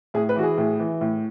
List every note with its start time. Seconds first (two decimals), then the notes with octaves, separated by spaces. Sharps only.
0.14 A2 G#4
0.29 B4
0.36 E3 F#4
0.43 G#4
0.58 A2
0.79 E3
1.01 A2